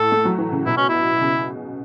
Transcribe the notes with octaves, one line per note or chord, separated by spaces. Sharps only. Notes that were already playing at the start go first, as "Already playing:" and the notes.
Already playing: A2 A4
A3
F#3
E3
C#3
B2 E4
C#4
E4
C#3